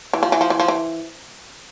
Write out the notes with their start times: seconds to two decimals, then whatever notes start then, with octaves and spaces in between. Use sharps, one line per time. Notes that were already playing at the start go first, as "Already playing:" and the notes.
0.13 E3
0.23 F3
0.32 E3
0.41 F3
0.50 E3
0.60 F3
0.68 E3